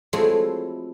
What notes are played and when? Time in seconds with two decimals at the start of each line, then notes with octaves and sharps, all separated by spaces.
0.13 F3 F#3 G#3 A3 C4 E4